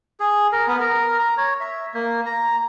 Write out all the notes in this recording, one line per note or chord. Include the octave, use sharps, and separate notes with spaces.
G#4
A#4
B3
A#4
A#5
C#5
E5
A#3
A#5